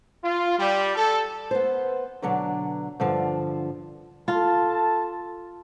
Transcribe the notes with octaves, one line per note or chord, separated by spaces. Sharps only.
F4
G3
A4
B3 C5
B2 D3 F#3 D4
G2 D3 F3
F4 A4 A5